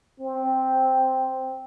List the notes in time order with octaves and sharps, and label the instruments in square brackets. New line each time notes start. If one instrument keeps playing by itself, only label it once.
[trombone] C4